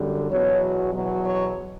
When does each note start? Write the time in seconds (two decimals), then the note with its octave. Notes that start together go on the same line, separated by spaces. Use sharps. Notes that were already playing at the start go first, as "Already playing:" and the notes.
Already playing: F#2 D3 G3
0.31 E2 B2 F#3 C#5
0.94 E2 B2 F#3
1.25 C#5